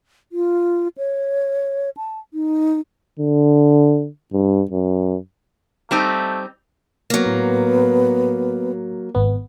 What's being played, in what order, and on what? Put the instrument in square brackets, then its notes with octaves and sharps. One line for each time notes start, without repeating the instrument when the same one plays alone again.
[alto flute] F4
C#5
A5
D#4
[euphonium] D3
G2
F#2
[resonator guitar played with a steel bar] G3 C4 D#4 [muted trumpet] A3
[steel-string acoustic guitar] F#3 A#3 [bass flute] B3
[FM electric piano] A2
G#1 B3